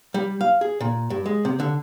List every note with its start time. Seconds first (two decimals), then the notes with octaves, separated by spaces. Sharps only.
0.14 G3
0.41 F5
0.61 G#4
0.81 A#2
1.10 G2
1.26 G#3
1.45 C3
1.60 D3